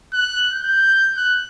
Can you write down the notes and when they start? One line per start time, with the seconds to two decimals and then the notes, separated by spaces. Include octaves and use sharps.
0.13 F#6
0.53 G6
1.17 F#6